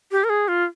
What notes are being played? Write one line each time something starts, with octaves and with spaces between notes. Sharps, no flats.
G4
A#4
G#4
F4